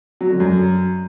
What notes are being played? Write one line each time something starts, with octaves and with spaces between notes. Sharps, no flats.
F#3
D3
F#2